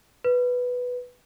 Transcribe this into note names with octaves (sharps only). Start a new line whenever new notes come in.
B4